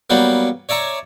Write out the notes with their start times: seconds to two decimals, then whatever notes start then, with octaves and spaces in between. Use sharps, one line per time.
0.10 F#3 G3 A#3 B3
0.69 C#5 D5 E5 A#5 C#6